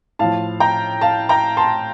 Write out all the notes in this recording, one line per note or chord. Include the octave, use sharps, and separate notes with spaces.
A2 F3 F5 A5
G5 A#5
F5 A5
G5 A#5
A5 C6